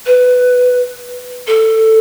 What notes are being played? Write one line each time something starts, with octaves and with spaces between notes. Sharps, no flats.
B4
A4